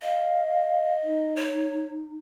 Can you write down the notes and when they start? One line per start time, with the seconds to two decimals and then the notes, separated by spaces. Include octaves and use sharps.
0.02 D#5 F5
1.04 D#4
1.36 C#5